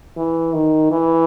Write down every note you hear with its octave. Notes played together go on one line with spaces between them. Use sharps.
E3
D#3
E3